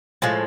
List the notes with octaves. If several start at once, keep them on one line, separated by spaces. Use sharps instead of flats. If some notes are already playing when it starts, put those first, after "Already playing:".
A2 F3 G#3